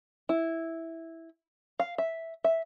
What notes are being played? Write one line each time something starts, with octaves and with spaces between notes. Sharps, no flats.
E4
F5
E5
E5